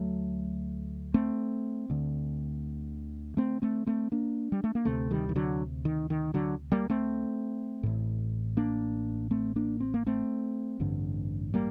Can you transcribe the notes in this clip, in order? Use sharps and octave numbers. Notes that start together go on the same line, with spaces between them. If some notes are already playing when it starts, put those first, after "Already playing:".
Already playing: D2 F#3 A3
A3 C4
D2 D3
A3 C4
A3 C4
A3 C4
A#3 D4
G3
A3
A#3
D2 C3 A3 C4
D#3 G3
D#3
D3 F#3
D#3
D#3
D3 F#3
G3 A#3
A3 C4
A1 A2
A#3 D4
A3 C4
A#3 D4
C4
A#3
A3 C4
A1 G2 D3
G3 A#3